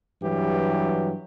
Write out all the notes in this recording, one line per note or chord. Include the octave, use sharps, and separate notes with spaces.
G2 E3 F#3 G4